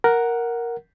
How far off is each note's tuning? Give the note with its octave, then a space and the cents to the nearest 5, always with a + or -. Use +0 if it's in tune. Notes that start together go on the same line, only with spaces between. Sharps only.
A#4 +5 F#5 +0